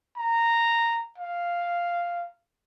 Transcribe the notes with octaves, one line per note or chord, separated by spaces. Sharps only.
A#5
F5